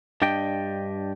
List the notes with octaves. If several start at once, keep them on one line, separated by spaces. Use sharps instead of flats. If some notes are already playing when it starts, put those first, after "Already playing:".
G2 D4 G4 D#5 G5